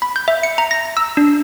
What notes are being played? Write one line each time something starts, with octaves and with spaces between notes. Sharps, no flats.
B5
G6
E5
C#7
A#5
A#6
E6
D4